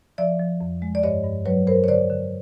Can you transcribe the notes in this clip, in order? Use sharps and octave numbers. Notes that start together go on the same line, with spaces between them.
F3 D5 E5
F3
F2
G#3
D5
G2 C#5 D#5
G2
F#3 B4 C#5
G2 A#4 C5
C#5
D3 C5 D5
D3